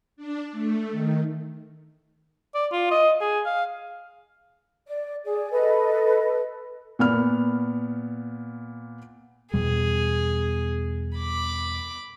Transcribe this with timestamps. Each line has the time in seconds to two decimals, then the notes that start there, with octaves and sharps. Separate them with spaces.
0.16 D4
0.52 A3
0.91 D#3
2.54 D5
2.72 F4
2.91 D#5
3.21 G#4
3.46 F5
4.86 D5
5.25 G#4 D5
5.51 A4 B4 D#5
6.99 A#2 B3 F6
9.54 E2 B2 G3 G#4
11.17 B5 D6